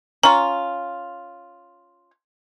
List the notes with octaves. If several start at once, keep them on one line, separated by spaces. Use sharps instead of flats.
C#4 F4 A#5